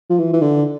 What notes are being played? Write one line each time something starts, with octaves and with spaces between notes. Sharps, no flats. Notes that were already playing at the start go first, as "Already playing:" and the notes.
F3
E3
E3
D3